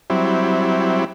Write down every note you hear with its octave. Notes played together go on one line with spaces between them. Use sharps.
F#3 G3 C4 E4